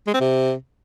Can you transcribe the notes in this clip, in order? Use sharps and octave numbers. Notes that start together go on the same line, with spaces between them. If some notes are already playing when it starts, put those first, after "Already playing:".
G#3
C4
C3